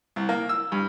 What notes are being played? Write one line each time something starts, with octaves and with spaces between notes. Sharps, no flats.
C2
A#3
E6
G2